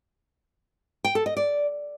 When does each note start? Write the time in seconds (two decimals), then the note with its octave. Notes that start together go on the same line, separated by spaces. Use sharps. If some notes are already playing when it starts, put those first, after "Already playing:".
1.05 G5
1.15 A4
1.26 D#5
1.37 D5